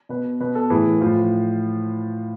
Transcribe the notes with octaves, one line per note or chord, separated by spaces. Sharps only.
B2 B4
B2 B4
A4
A2 E3 G#4
A2 F3 F4